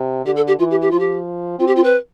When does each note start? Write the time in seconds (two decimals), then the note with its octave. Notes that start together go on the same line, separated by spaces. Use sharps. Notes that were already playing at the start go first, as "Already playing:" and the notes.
Already playing: C3
0.25 D3 G4
0.36 A4
0.47 G4
0.59 E3 F4
0.70 G4
0.81 G4
0.91 F3 F4
0.99 G4
1.59 C4 F4
1.67 G4
1.76 F4
1.84 B4